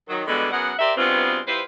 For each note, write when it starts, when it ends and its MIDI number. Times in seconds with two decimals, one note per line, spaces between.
0.09 0.22 51
0.09 0.22 54
0.27 0.50 47
0.27 0.50 50
0.27 0.50 52
0.27 0.50 55
0.27 0.50 56
0.27 0.50 59
0.51 0.73 42
0.51 0.73 59
0.51 0.73 68
0.51 0.73 70
0.51 0.73 78
0.79 0.93 67
0.79 0.93 70
0.79 0.93 72
0.79 0.93 74
0.79 0.93 76
0.96 1.39 43
0.96 1.39 47
0.96 1.39 56
0.96 1.39 59
0.96 1.39 60
0.96 1.39 65
1.47 1.61 55
1.47 1.61 64
1.47 1.61 65
1.47 1.61 71
1.47 1.61 72